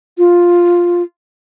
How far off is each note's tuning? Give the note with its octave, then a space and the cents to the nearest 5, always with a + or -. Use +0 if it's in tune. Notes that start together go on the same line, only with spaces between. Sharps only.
F4 +5